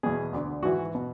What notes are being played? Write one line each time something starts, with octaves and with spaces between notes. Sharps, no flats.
E2 B2 G#4
D2 D3
G#2 E3 F#4
B2